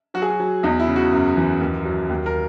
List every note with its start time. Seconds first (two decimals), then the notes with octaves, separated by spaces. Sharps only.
0.14 F#3 F#4
0.22 G#4
0.30 F#4
0.40 F#3
0.63 E2 D#4
0.80 E4
0.88 C#3
0.96 F#4
1.12 F#2
1.37 E3
1.61 D#2
1.85 F#3
2.10 D#2
2.26 A#4